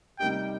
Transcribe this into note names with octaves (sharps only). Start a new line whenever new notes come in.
C3 G3 A#3 D#4 G4 G5